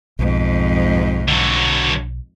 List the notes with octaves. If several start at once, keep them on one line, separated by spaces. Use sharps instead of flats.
B1 F2 G#2
D3 F#3